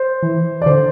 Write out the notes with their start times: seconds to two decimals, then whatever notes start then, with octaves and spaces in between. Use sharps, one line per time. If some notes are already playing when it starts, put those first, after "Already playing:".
Already playing: C5
0.22 E3
0.62 D5
0.66 D3 C5